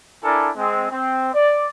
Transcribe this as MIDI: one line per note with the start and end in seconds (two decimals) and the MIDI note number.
0.23 0.50 62
0.23 0.50 64
0.23 0.50 69
0.23 0.50 70
0.23 0.50 80
0.23 0.50 86
0.56 0.88 56
0.56 0.88 60
0.90 1.29 60
1.34 1.68 74